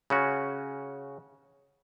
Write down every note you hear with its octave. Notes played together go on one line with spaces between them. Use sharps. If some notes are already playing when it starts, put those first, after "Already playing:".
C#3 C#4 F#4